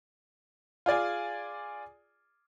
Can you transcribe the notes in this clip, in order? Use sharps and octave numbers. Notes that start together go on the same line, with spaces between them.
F4 G#4 D5 G#5